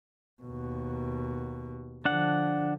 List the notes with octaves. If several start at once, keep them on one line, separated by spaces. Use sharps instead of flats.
D#2 B2
D3 F3 D4 F#5